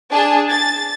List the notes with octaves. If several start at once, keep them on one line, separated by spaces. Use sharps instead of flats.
D4 G#4 A5
A6